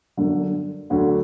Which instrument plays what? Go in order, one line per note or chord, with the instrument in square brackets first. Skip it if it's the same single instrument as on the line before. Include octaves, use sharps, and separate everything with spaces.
[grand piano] G1 F#2 D3
D2 D3 F#3